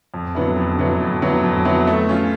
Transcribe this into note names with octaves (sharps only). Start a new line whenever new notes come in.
F2
D3 F#3 B3 E4
F2
D3 F#3 B3 E4
F2
D3 F#3 B3 E4
F2
D3 F#3 B3 E4
A3
C#4 F4